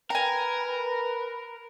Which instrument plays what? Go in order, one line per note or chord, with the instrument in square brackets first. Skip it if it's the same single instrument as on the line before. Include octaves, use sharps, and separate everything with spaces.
[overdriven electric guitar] A#4 [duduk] B4 [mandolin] G#5 A#5